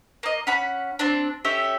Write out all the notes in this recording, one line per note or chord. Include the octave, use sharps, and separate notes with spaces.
A#3 D#5
C#4 F#5 B5
C4 D4
C#4 G4 A4 E5